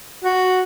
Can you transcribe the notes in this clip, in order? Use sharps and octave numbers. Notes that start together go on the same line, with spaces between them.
F#4